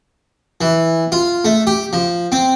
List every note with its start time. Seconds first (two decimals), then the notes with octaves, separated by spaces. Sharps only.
0.61 E3
1.12 F4
1.45 A3
1.67 G4
1.93 F3
2.32 C4